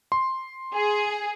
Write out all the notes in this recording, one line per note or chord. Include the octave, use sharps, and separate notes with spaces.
C6
G#4